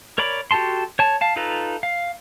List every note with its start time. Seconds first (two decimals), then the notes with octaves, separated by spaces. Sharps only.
0.18 A#4 C#5 D5 B5 D6
0.51 F#4 G4 A4 A5 C6
0.99 C#5 A5
1.21 F5 A5
1.36 D#4 F4 A4 B4 A#5
1.83 F5